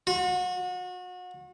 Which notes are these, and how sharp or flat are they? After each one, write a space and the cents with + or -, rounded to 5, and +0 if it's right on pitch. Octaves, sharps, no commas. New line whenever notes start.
F#4 -35